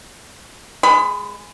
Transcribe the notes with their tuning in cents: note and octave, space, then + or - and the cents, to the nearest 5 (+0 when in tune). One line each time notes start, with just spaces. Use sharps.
G#3 -5 B5 +25